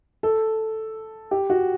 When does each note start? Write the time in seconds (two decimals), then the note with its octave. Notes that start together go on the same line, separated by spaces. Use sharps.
0.23 A4
1.31 G4
1.50 F#4